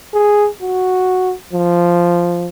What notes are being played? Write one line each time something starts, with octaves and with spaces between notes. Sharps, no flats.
G#4
F#4
F3